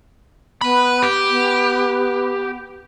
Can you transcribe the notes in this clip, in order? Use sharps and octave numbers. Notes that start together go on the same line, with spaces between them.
B3 B4 B5
G4
B3